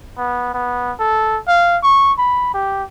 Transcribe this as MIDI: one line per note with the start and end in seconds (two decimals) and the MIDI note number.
0.18 0.49 59
0.54 0.92 59
1.00 1.39 69
1.47 1.77 77
1.83 2.13 85
2.18 2.50 83
2.54 2.84 67